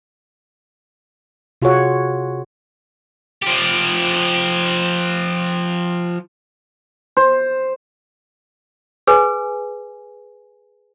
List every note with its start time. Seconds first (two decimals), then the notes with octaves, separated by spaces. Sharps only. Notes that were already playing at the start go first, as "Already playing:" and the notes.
1.62 C3 F4 F#4 G#4 C#5 F#5
3.42 F3 G4
7.17 C5
9.07 G#4 B4 G#5